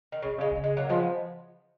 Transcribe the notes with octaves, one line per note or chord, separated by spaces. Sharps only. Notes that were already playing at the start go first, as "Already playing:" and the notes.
D#3
C#3
B2
C#3 G#3
C#3
G#3
F#3 A#3
F3 G#3 B3